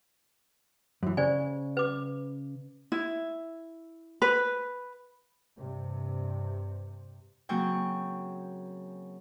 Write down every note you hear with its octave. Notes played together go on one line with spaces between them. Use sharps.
F#2 E3
C#3 C5 D5 G#5
B4 D6
E4
B4
G2 C3
C#3 F#3 A#3 C4 G5 C#6